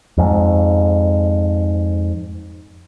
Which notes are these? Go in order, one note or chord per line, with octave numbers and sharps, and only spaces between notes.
F2 G#2